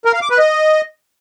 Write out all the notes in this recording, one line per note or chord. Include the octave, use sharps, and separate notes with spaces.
A#4
F5
D6
B4
D#5